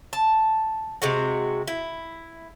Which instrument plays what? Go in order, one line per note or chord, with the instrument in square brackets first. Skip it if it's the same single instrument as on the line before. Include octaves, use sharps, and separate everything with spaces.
[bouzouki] A5
C3 G#3 F#4
E4